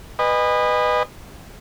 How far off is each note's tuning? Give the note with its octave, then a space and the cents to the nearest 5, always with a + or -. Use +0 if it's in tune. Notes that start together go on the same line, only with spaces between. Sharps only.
B4 +0 D#5 -25 G#5 -40